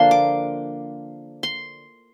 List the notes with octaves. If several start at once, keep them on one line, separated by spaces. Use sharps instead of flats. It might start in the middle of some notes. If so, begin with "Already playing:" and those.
Already playing: D3 F3 A#3 D4 A5 C6
D6
C6